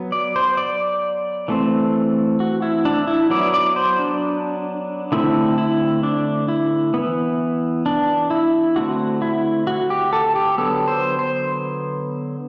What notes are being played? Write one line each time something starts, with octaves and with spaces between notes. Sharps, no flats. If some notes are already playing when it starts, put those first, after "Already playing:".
Already playing: F#3 B3
D5
C5
D5
E3 A3 C4
F#4
E4
D4
E4
F#3 B3 D5
D5
C5
D4
D3 A3 C4 E4
E4
D4
E4
E3 B3
D4
E4
D3 A3 C4 F#4
E4
F#4
G4
A4
G4
D3 F#3 B3 A4
C5
C5